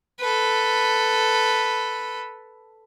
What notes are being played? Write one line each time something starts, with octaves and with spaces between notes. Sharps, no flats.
A4 B4